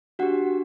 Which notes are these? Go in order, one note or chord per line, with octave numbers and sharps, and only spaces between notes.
D4 F#4 G4 F#5